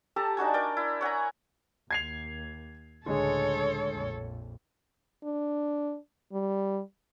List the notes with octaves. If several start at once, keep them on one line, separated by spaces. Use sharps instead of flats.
G4 A4 A5 A#5
D4 D#4 F#4 G#5
A#4 D5 G5
E4
C#5 F#5 G#5 A#5
D#2 G#6 C7 F7
C#2 A2 D3 G#3 G#4 A4 C#5
A#1 F2
D4
G3